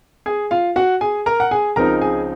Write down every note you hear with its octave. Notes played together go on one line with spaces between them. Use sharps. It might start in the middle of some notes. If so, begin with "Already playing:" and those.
G#4 G#5
F4 F5
F#4 F#5
G#4 G#5
A#4 A#5
F#5
G#4 G#5
C#2 C#3 F3 C4 D#4 A#4 A#5
G#4 G#5